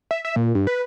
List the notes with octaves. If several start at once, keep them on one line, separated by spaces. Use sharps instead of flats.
E5
E5
A#2
G2
B4